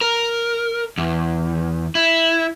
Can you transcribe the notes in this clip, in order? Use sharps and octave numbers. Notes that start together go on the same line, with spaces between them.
A#4
E2
E4